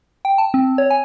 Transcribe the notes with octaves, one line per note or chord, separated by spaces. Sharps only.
G5
A5
C4
C#5
G#5